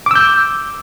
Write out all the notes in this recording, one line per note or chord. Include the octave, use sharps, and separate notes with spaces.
D6 E6 G6